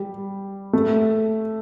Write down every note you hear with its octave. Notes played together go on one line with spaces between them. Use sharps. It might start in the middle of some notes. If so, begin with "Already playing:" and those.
Already playing: G3
A3